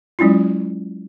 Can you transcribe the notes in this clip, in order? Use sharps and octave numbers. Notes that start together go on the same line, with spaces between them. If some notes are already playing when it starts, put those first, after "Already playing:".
F#3 G#3 C#4 E4 F4